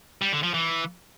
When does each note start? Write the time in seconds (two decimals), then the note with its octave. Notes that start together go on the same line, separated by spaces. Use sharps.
0.22 G3
0.32 D3
0.43 F3
0.54 E3